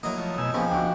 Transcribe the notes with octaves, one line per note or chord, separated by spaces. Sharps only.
F#3 A#3 E4 D#5
F3 A3
B2 D#4 G#5 E6
F3 G#3 A#3 B3 C#4 G4
D2 D4 F#4 G4